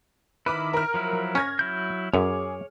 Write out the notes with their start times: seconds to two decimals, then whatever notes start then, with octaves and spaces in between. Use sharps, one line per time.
0.46 D#3 E4 B4 B5 D6 F6
0.73 A#4 F6
0.94 F3 F#3 E4
1.35 C#4 F6 G#6 A#6
1.59 F#3 E4 G6
2.14 F#2 G#4 C#5 D6